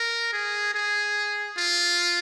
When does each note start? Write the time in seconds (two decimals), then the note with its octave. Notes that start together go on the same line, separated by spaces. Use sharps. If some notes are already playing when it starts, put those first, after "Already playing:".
Already playing: A#4
0.33 G#4
0.74 G#4
1.57 F4